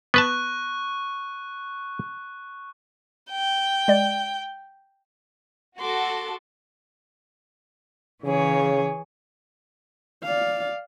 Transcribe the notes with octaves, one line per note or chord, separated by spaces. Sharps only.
B3 B4 A5 C#6 F#6
G5
G#3 D5
F#4 A4 C6 D6
C#3 E3 G#4 C#5
D5 F5